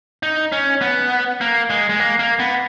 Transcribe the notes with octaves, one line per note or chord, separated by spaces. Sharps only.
D#4
C#4
B3
A#3
G#3
G#3
A#3
A#3
B3